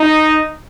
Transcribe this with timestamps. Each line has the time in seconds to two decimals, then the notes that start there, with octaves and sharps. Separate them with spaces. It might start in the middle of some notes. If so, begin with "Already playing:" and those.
Already playing: D#4